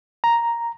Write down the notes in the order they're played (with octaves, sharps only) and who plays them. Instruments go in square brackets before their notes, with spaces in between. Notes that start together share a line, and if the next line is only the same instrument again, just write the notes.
[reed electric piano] A#5